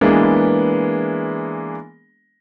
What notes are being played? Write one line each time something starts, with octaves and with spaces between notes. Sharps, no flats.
E3 G#3 A#3 B3 D4